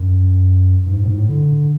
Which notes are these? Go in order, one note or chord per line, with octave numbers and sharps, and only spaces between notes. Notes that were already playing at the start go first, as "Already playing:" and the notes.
Already playing: F#2
G2
G#2
G2
A2
G#2
A2
D3